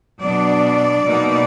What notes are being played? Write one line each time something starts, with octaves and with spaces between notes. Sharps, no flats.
B2 F#3 B3 D4 D5
B2 A#3 D#4